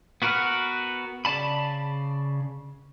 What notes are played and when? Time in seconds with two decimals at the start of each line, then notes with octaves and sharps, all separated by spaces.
0.22 B3 F#4 A#4 B4 F6
1.25 C#3 D5 A5 B5